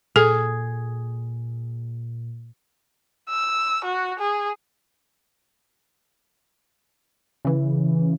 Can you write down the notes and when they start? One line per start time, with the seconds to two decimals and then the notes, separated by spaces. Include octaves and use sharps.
0.16 A#2 G#4 A4
3.29 E6
3.84 F#4
4.18 G#4
7.45 C#3 E3